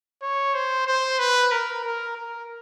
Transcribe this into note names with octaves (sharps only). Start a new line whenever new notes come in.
C#5
C5
C5
B4
A#4
A#4
A#4